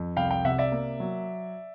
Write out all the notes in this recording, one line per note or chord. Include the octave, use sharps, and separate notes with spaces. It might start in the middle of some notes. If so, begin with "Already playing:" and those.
Already playing: F2
C2 F5 G5
F5 G5
C3 E5 F#5
D5 E5
A#3
F#3